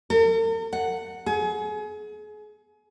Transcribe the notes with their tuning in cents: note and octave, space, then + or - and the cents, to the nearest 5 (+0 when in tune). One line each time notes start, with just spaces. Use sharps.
A#4 -45
F#5 +0
G#4 +35